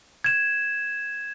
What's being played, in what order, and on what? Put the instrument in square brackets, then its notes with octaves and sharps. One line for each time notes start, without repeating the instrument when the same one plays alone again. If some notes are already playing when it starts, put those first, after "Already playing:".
[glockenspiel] G#6 E7